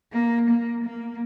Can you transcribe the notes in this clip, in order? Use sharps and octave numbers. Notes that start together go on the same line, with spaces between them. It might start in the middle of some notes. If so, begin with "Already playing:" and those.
A#3
A#3
A#3